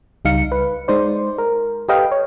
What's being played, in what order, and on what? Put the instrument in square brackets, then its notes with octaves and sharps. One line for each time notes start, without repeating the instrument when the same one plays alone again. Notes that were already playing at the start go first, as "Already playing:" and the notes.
[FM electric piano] C#2 G3 D#4 F5 C#7
B4
G#3 D#4 C5 D5
A#4
G4 A4 B4 D#5 F5 G5
C#5